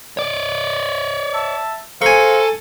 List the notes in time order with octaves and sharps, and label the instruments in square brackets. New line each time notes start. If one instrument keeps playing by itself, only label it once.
[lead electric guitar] C#5 D5
[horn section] E5 A5
[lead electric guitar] A4 [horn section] C5 F5 A#5 [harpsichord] G#5 C#6